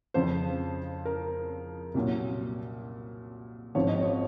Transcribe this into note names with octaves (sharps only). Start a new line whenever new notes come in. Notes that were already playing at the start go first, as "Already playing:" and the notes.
F2 C#3 F3 C5
A#4
C2 A#2 F#3
G#1 G#2 F3 C#5
D#5
C#5